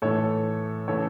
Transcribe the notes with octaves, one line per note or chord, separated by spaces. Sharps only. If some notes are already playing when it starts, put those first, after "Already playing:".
A2 E3 A3 A4 C#5
C#3 E3 A3 A4 C#5